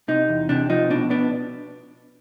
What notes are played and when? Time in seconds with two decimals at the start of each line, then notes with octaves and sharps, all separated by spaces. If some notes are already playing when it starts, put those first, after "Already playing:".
0.08 C3 D#4
0.29 E2
0.49 C3 D4
0.70 F3 D#4
0.90 B2 D4
1.10 B3 D4